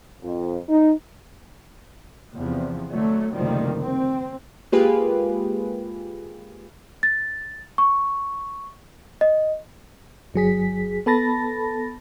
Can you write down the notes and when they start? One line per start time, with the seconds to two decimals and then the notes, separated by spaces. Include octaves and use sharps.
0.22 F2
0.69 D#4
2.34 E2 C3 F3
2.90 D3 F#3 A3
3.32 F#1 D2 C3 D#3 F3 G3
3.80 C4
4.72 G#3 A#3 F4 G4 G#4 B4
7.03 A6
7.78 C#6
9.21 D#5
10.34 G1 F#3 G#4 B6
11.06 B3 A4 A5 B5 A6 A#6